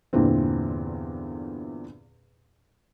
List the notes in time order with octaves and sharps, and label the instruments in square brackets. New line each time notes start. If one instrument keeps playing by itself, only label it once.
[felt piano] E2 G2 A#2 D3 E3 C4